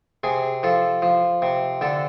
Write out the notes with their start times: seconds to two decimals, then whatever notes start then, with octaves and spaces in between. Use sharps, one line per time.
0.24 C3 G#4
0.63 F3 A4
1.02 F3
1.42 C3
1.81 D3 A4